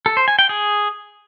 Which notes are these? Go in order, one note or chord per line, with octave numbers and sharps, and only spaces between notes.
A4
C5
G#5
G5
G#4